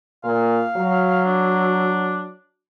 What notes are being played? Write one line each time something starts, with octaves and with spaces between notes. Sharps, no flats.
A#2 F5
F#3
D4